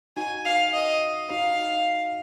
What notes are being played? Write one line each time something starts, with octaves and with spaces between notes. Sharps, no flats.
D#4 F#4 G#5
F5
D#5
D#4 F#4 F5